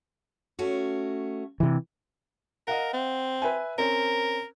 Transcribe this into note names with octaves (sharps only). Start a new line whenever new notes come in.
A3 C#4 F#4
C3 E3
A#4 D#5 F5 F#5
C4
B4 E5 G#5
C4 C#4 A#4